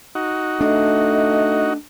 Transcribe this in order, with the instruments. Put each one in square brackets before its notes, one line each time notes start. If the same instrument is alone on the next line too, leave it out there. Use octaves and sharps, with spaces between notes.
[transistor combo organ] D#4 F#4
[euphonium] A3 [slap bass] D4 [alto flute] D#5